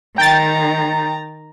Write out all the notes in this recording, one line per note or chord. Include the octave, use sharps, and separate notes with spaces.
D#3 G5 A#5 A6